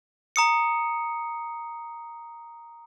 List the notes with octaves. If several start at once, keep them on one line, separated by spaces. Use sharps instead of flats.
A#5 D#6 C#7